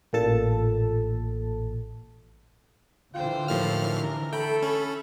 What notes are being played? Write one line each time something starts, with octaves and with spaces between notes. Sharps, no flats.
A1 A#2 A4 A5
D3 E3 F4 C5 G5
D#2 A2 F3 F6
A#4
A3 A4 G5 B5
C#4